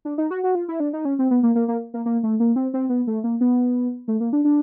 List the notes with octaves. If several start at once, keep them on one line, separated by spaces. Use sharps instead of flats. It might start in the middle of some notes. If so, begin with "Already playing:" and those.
D4
D#4
F#4
F#4
F4
E4
D4
D#4
C#4
C4
B3
A#3
A#3
A#3
A#3
A#3
A3
A#3
C4
C4
B3
A3
A#3
B3
A3
A#3
D4
D4